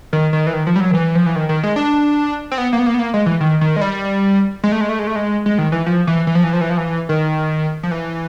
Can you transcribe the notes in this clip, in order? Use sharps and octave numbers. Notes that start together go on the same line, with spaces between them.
D#3
D#3
E3
D#3
F3
G3
F#3
D#3
E3
F3
E3
D#3
D#3
G#3
D4
C4
B3
A#3
B3
A#3
B3
A#3
G#3
E3
D#3
D#3
G#3
G3
G#3
A3
G#3
A3
G#3
A3
G#3
G#3
D#3
E3
F3
E3
E3
F3
E3
F3
E3
F3
E3
D#3
F3
E3